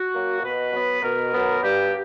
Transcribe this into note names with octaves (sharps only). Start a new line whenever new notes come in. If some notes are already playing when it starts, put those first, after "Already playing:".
Already playing: F#4
F#3 A#3
B2 B4
F#3 B3
B2 A#4
F#3 B3
G2 G4